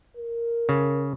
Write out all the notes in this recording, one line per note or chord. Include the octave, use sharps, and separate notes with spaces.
A#4
C#3